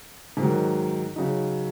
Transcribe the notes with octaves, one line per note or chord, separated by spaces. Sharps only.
G#2 D#3 F#3
C#3 F#3 D#4